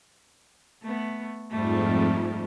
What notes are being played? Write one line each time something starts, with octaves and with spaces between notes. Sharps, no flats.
A3 B3
F2 G#2 F3 G3 A3